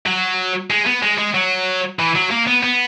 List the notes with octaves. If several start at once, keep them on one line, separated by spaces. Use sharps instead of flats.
F#3
G#3
B3
G#3
G#3
F#3
E3
F#3
A#3
B3
B3